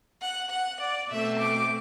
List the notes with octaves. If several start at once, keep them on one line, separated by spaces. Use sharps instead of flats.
F#5
F#5
D5
B2 A3 C4 E5
D6